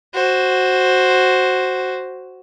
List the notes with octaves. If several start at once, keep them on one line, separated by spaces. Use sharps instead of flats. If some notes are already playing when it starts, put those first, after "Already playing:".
F#4 C5